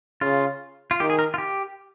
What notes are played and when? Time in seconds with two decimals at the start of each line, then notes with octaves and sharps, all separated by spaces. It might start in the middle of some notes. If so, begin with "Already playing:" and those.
0.21 C#3 F4
0.91 F4
1.00 D#3 G4
1.10 G#4
1.19 A#4
1.34 F4
1.38 G4